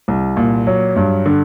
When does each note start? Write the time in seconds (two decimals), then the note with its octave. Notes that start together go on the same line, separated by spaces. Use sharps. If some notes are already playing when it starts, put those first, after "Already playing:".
0.08 C2
0.37 A#2
0.67 F#3
0.96 G2
1.26 D3